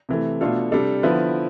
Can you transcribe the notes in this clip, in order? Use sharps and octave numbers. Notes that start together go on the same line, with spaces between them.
C3 E3 A3
B2 A3 D4 F4 A4
C3 G3 D4 A4
D3 F3 B3 E4 B4